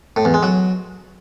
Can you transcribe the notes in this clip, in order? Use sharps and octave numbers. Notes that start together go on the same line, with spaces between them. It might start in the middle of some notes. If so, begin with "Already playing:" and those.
A2
E2
G#3
F#3